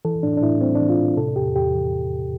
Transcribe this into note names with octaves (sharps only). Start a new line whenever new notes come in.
E3 A4
A2 D4
D4
A2 E4
G3 C4
E3 D4
F4
A2
C3 A4
E2 G4
E2 G4
E3